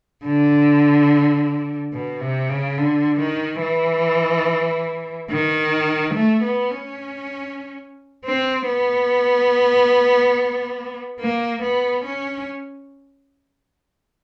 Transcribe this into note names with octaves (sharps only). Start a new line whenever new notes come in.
D3
B2
C3
C#3
D3
D#3
E3
D#3
A3
B3
C#4
C4
B3
A#3
B3
C#4